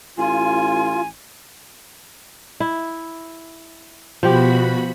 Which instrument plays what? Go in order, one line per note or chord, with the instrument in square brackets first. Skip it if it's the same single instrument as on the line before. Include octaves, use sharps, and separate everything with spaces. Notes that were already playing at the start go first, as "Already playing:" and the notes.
[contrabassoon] A1 [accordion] F4 [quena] G#5
[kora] E4
[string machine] B2 F#4 B5 [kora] F3 G4